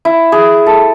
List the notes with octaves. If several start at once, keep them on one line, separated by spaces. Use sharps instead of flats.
E4
G#4
A4